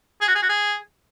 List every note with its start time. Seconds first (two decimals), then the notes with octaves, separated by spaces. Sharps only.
0.21 G#4
0.28 F#4
0.35 G#4
0.42 F#4
0.49 G#4